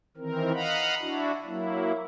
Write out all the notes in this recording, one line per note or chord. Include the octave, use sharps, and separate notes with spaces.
D#3 E3 C4 A#4
D#5 F5 F#5 A#5 B5
D4 E4 F#4
F#3 A#3 E4